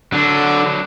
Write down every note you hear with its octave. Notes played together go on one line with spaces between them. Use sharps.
D3 F#3 D4